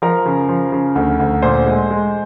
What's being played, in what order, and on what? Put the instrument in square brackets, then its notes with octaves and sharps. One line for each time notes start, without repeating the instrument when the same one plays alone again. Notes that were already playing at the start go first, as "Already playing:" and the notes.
[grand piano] F3 A#4
C#3
F3
C#3
D2
D2
A#2 C5
G#3
G#3